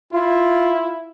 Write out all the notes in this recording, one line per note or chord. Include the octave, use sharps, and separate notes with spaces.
E4 F4